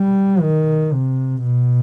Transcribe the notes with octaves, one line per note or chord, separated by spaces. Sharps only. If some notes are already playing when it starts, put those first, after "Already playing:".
Already playing: G3
D#3
C3
B2